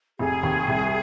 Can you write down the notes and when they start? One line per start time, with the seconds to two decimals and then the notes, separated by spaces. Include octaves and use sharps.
0.19 F1 G#4
0.43 D#2
0.68 C2